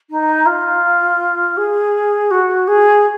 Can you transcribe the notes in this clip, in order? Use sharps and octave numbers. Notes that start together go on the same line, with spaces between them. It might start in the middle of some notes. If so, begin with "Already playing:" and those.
D#4
F4
G#4
F#4
G#4